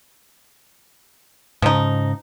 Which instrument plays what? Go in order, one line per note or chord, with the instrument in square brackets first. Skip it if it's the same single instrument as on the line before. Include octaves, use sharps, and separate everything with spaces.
[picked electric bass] G#2 C#3 [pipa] F3 D#4